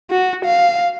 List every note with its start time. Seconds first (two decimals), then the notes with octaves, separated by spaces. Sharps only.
0.11 F#4
0.45 F5